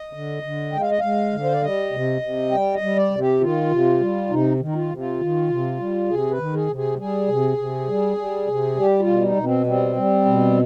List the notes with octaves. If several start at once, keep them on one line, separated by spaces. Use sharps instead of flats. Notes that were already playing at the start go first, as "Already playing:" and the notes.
Already playing: D#5
D3
D3
G#3 G5
F5
D#5
G#3 F5
D3
C5
D5
G3 D#5
C3
C3
G3 G5
D#5
G3
D5
C3
G4
D#3 F4
C3
G3
C3 D#4
D#3
D#4
F4
C3
F4
D#3
C3
G3
C3 G#4
B4
D#3
G#4
C3
G#4
G3 G#4
C3
C3
G3
G3
C3
G3 G4
F4
B2
D#4
B2
C4
G3 C4
G3
B2